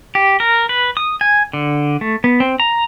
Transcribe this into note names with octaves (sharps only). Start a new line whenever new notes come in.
G4
A#4
B4
D#6
G#5
D3
A3
B3
C4
A#5